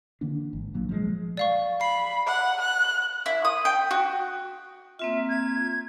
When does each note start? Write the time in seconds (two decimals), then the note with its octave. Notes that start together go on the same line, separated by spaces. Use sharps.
0.21 D3 E3 A#3 D4
0.53 G#1
0.74 A#1 A#2 F#3 A#3
0.89 F3 G#3
1.37 D5 F5 C#6
1.81 B5 C7
2.27 F#5
2.62 F#6
3.26 E4
3.45 D#6
3.65 G5
3.91 F#4
4.99 A#3 C4 F4 E5
5.29 G#6